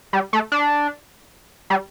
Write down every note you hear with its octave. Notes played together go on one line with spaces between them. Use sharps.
G3
A3
D4
G3